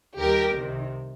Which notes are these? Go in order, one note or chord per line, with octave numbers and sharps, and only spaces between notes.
D#2 D#3 G3 G4 A#4
C2 C3 D#3